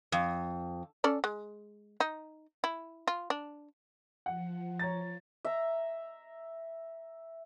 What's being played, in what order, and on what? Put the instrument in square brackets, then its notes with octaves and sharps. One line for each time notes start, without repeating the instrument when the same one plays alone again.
[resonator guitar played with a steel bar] F2
[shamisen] C#4 A4 D5
G#3
D#4
E4
F4
D4
[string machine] F3 [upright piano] F#5
[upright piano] C#5 A#5 A6
[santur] E5 A#5